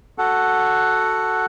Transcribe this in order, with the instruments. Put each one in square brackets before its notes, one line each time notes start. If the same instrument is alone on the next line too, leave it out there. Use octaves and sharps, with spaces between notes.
[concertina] F#4 A4 F#5